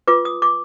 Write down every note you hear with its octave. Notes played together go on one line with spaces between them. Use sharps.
F4 B4 D6
D#6
D6